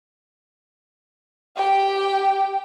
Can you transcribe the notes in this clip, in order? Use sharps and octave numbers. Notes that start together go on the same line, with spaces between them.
G4 G5